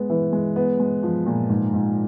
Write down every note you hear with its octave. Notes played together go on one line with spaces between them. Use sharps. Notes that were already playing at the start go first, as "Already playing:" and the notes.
Already playing: G#3 B3
E3
G#3
B3
G#3
F3
A#2
G#2
G#2